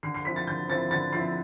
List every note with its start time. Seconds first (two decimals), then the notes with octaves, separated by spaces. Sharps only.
0.03 D3 C7
0.15 C7
0.25 F3 C4 E4 B6
0.36 A6
0.47 D3 G6
0.69 F3 C4 E4 A6
0.91 D3 A6
1.13 F3 C4 E4 C7